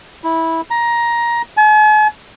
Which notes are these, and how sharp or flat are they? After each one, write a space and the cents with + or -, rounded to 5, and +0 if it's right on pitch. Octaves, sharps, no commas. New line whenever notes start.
E4 -15
A#5 +15
G#5 +45